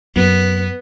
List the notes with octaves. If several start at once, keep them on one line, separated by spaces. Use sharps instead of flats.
F#2 B3